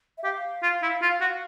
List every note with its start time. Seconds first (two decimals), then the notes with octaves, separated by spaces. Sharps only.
0.18 E5
0.24 G4 F5
0.63 F4
0.82 E4
1.02 F4
1.21 F#4